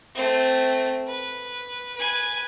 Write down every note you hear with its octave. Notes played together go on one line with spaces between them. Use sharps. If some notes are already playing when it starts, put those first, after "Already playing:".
A3 C4
B4
B4 G#5